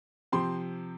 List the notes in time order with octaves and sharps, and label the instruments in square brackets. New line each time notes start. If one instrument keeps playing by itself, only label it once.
[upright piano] C3 F3 C4 C6